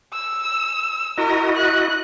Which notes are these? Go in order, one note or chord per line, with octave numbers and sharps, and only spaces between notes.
E6
E4 F#4 A#4 D#5
F#6